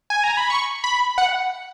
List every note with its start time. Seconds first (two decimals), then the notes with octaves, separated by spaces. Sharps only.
0.10 G#5
0.24 A#5
0.37 B5
0.50 C#6
0.84 B5
1.18 F#5